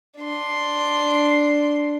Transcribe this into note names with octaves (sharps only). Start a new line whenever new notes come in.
D4 C6